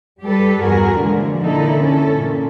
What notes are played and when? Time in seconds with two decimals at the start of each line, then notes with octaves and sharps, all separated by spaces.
0.22 G3 G4 A4 B4
0.61 E2 G2 F#4 G#4 A#4
0.96 A#2 D3 E3 F3 G#3
1.43 A#2 D3 E3 D#4 E4 A4
1.82 C#4 A4
2.17 A#2